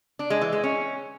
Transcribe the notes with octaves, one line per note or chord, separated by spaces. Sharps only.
D4
G#3
E3
G#3
C#4